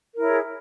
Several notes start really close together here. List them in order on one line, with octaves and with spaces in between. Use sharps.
A#4 E4 C#5 G#4